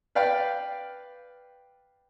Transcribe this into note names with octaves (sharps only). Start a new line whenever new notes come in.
B4 D5 F5 G5